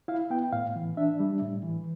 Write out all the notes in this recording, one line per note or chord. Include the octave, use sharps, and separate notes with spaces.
E4 F5
B3 G5
A2 F5
E3
D4 E5
G3
A2
E3